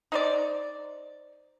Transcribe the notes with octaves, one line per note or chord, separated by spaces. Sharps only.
D#4 C5 D5